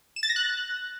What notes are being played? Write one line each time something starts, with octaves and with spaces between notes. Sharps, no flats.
E7
A6
A#6
F#6